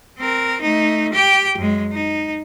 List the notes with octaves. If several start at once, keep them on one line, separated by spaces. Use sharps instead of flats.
C4 A#4
A3 D#4
G4 G5
F#2 G#3
D#4